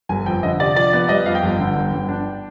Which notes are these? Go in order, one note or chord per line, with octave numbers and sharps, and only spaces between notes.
G1 G#5
F2 G5
D3 D#5
C3 D5
F3 D5
B3 D5
G3 D#5
F2 F5
G5
G1
D3
G1
G1
D4